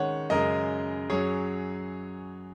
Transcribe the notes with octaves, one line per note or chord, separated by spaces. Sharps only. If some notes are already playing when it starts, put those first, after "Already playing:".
Already playing: D#3 G#3 C#4 C#5 F#5
F#2 C#3 G#3 A#4 D#5
F#2 F#3 C#4 G#4 C#5